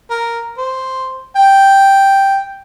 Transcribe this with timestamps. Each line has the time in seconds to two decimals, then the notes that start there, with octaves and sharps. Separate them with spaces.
0.10 A#4
0.58 C5
1.36 G5